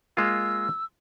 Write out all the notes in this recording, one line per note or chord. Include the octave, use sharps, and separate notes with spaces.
G#3 A#3 F4 E6